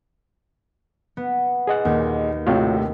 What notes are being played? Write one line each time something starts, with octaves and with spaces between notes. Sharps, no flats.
B3
G#4 D#5 F#5
D#2 A#2
A#1 A2 C3 F4 F#4 C#5